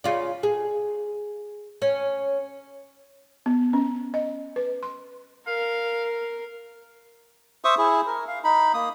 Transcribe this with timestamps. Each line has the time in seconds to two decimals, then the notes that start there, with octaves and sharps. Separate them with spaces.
0.04 C#3 F4 D5
0.43 G#4
1.82 C#4
3.46 B3
3.73 C#4
4.14 D#5
4.56 B4
4.83 C6
5.47 A#4 F5
7.64 C5 E5 C#6 D#6
7.78 E4 G#4
8.07 A#4
8.28 F5
8.44 D#4 B5
8.74 A#3 D#6